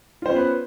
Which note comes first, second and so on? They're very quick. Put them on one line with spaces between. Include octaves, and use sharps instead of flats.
F4 C5 C#4 B3 B4